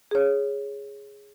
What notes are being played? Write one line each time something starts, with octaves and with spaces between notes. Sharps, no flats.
G#4 C#5